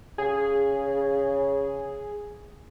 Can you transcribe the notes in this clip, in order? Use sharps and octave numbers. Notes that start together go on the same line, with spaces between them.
C#3 G#4